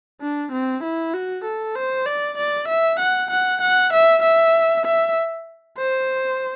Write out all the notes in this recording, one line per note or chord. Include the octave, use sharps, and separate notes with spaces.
D4
C4
E4
F#4
A4
C5
D5
D5
E5
F#5
F#5
F#5
E5
E5
E5
C5